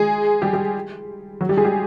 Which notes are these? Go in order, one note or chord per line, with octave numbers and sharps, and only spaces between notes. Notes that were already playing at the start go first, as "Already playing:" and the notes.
Already playing: G#3 G#4
G3 G4
G3 G4
F#3 F#4
G3 G4
G#3 G#4
G3 G4